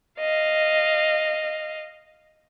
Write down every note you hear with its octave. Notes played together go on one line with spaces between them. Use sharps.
D#5 F5